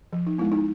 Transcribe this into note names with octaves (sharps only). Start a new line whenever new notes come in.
F3
D#4
G#3 B3 E4
D#4